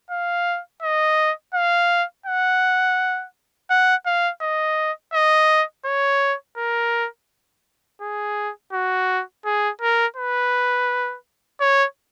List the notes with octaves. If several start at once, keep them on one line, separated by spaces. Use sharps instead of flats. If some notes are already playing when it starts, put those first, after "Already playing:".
F5
D#5
F5
F#5
F#5
F5
D#5
D#5
C#5
A#4
G#4
F#4
G#4
A#4
B4
C#5